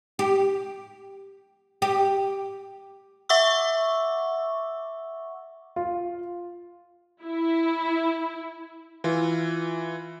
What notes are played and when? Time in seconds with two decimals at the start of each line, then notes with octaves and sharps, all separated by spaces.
0.19 G4
1.82 G4
3.29 E5 F#5 C#6 D6 E6
5.76 F4
7.22 E4
9.04 E3 F4